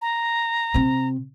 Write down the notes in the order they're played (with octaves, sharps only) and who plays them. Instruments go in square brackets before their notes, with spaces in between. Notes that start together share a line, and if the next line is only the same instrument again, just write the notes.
[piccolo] A#5
[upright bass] C3 C4